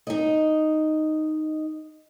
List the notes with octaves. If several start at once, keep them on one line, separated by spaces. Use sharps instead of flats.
D#4 D#5